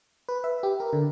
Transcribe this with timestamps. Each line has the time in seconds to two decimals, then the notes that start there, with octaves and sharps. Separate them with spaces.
0.29 B4
0.44 E5
0.63 G4
0.80 A#4
0.93 D3